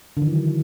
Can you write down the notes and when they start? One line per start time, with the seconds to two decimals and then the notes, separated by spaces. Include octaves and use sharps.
0.17 D3
0.22 D#3
0.27 E3
0.32 F#3